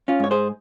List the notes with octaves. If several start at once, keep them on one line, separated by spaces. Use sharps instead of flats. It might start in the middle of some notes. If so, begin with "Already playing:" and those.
C#4 F4
G#2 C#5
G#4 C5